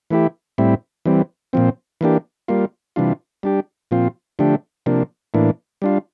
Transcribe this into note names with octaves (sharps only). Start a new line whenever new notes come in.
E3 A3 E4 G4
A2 G3 C4 E4
E3 G3 C4
A#2 F3 C4
E3 A#3 D4 G4
G3 A#3 F4
C3 E3 G3 D4 F4
G3 D4 G4
A#2 F3 C4 F4
D3 F3 A3 D4 G4
C3 F3 A#3 D4
A2 E3 A#3 D4
G3 D4 F4